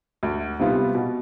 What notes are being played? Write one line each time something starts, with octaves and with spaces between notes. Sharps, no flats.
D2
C3 G3 B3 F4
B2